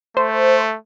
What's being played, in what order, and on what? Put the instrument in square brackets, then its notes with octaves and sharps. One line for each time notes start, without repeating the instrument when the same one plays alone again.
[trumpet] A3 [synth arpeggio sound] C5